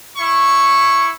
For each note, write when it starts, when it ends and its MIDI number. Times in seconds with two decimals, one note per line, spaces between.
0.17 1.10 64
0.17 1.10 85